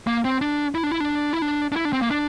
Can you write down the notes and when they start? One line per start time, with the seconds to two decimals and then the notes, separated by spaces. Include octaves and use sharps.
0.07 A#3
0.25 C4
0.41 D4
0.75 E4
0.83 D4
0.91 E4
1.00 D4
1.33 E4
1.42 D4
1.72 D4
1.76 E4
1.85 D4
1.93 C4
2.02 A#3
2.10 D4